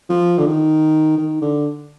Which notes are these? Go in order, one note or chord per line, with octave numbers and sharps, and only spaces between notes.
F3
D3
D#3
D#3
D3